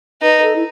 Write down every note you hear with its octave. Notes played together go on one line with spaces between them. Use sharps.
D#4 B4
A4
E4